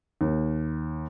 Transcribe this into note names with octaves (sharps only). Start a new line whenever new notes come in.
D#2